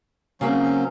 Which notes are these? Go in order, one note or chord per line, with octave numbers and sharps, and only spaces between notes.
C#3 F#3 A#3 C4 C#4